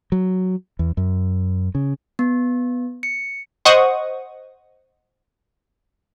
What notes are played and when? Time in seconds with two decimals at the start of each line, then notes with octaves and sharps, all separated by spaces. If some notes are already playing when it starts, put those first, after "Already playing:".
0.12 F#3
0.79 E2
0.97 F#2
1.75 C#3
2.19 B3
3.03 C#7
3.65 C5 D#5 F#5 C#6 D#6